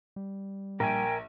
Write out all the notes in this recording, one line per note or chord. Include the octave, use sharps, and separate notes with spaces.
G3
A#1 A#4 G5 G#5